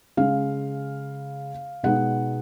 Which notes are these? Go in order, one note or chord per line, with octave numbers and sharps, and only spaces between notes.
C#3 G#3 C#4 F5
B2 G#3 B3 D#4 F#5